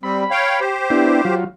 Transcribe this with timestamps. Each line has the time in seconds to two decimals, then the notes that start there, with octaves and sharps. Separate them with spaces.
0.03 G3 C4 B5
0.31 C#5 F5 G5
0.60 G4 C5
0.90 B3 D4 E4
1.25 F#3 F4